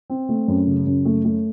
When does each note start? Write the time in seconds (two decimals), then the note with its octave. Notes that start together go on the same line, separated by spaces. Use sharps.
0.10 C4
0.29 A3
0.48 F#2
0.67 C#3
0.86 F#2
1.05 A3
1.25 A3